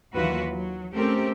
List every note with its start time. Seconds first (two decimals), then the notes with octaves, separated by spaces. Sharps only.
0.14 D#2 E3 F#3 F4 F#4 B4
0.51 F#3
0.93 A3 C4 C#4 G4 A4 A#4